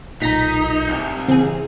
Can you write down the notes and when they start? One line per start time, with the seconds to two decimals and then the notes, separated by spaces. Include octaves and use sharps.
0.22 B1 A#2 D#4 A#5 A#6 B6
0.89 C2
1.28 C#3 E3 C4 G#4